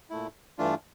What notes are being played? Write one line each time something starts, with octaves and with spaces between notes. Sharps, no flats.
A#2 A3 E4
G2 E3 A3 D4 F4